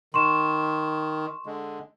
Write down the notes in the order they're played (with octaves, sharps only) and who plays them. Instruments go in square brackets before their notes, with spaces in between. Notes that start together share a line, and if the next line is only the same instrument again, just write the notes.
[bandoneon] D#3 [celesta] C6 C#6 E7
[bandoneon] D3 G#3